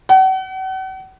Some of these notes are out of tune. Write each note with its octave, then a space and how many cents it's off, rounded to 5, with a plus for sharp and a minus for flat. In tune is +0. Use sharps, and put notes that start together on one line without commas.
F#5 +40